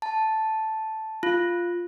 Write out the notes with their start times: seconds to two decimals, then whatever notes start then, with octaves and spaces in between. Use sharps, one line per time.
0.02 A5
1.23 F4